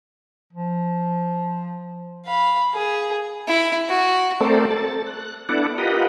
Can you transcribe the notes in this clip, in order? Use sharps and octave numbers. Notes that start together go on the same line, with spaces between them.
F3
F5 B5
G#4
E4
F#4
A3 C4 A4 A#4 C5 D5
A4 A6
F#6
B3 D4 E4 A4 D5 F#5
F4 G4 A#4 B4 D#5 F#5